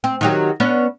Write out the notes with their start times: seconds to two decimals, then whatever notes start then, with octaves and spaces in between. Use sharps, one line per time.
0.04 C4
0.21 D#3 F#3 G4
0.60 B3 C#4 D4